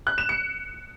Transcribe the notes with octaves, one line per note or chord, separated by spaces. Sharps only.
F#6
E7
C#7